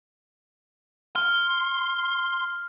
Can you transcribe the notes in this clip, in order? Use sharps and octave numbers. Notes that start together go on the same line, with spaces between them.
C6 F6